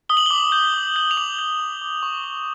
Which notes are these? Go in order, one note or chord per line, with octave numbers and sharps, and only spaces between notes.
D#6 G7
F#7
D6 G7
G6
D6
G6
F7
D6 F#7
G6
D6
D6
C#6
C#6